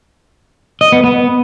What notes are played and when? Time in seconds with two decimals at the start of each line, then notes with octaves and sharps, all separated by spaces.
0.81 D#5
0.92 B3
1.04 B3